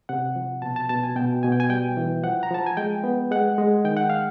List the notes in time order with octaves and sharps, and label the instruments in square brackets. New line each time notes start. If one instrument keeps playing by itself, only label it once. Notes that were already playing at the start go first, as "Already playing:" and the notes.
[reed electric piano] C3 F#5
F3
B2 A5
A5
B2 A5
G#5
B2 G5
B2 G#5
G5
G#5
G3 G5
E3
F3 F#5
A#5
F3 A5
G#5
G#3 G5
B3
G#3 F#5
G#3
D#3 G5
F#5
F5